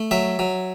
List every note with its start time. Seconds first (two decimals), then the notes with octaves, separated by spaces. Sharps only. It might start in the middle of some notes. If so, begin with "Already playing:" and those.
Already playing: A3
0.11 F#3 E5
0.39 F#3